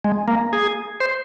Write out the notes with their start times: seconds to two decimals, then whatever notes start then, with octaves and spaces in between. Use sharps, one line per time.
0.04 G#3
0.28 A#3
0.53 G#4
1.00 C5